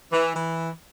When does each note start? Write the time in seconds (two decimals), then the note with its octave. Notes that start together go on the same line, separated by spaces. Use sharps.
0.12 E3
0.35 E3